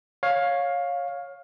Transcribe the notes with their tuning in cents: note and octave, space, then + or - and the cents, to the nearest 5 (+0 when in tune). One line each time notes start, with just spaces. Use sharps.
C#5 +0 F5 +15